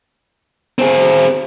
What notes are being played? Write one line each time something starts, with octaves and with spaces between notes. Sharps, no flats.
C4 G#4